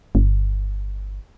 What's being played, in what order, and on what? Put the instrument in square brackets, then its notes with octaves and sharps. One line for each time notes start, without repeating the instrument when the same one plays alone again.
[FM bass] G1